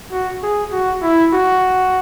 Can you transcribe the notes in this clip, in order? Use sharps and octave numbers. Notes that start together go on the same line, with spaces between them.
F#4
G#4
F#4
E4
F#4